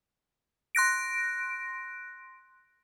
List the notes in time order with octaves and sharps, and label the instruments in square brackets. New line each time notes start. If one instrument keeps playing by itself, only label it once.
[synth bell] C6 F#6 A#6 D7